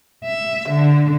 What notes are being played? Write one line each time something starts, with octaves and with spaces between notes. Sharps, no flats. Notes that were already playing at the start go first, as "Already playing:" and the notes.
E5
D3